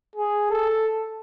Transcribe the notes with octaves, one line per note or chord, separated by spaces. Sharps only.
G#4
A4